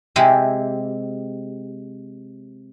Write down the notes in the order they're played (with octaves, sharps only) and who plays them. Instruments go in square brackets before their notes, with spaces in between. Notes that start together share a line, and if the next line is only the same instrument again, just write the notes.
[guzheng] C3 G#3 E4 G4